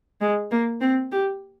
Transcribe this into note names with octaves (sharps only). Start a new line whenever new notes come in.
G#3
A#3
C4
G4